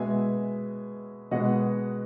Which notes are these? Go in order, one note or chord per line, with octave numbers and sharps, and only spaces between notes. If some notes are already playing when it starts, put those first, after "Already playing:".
Already playing: B2 G#3 B3 E5 G#5
B2 G#3 B3 D#5 F#5